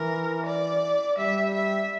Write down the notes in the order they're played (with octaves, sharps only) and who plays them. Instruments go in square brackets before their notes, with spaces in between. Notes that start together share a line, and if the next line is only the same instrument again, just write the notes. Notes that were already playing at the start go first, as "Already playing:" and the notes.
Already playing: [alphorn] E3 [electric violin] A#4
[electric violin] D5
[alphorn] G3 [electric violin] E5
[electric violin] E5